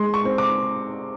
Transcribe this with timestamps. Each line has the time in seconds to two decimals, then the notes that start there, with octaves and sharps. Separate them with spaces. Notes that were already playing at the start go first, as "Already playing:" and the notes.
Already playing: G#3 C6
0.14 C#6
0.25 C4
0.38 D6